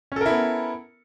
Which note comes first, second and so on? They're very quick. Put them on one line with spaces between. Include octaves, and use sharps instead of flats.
C#4 A4 A#4 E4 B3